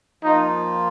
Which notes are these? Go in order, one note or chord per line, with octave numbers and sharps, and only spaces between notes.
F3 A#3 D#4 F4